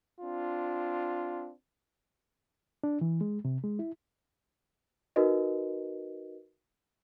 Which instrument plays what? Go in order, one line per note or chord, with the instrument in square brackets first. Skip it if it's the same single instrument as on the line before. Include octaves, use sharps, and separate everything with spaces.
[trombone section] C4 D4 F4
[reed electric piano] D4
E3
G#3
C3
G#3
E4
[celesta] D#4 F#4 A#4 B4 D#5